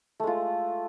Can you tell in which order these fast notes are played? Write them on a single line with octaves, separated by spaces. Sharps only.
A3 G#3 F4